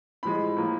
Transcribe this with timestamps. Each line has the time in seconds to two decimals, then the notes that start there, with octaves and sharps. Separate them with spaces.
0.23 A2 F3 G#3 B5
0.57 A2 F3 A#3